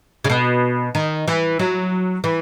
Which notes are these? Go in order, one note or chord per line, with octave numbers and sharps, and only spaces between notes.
C#3
B2
D#3
E3
F#3
E3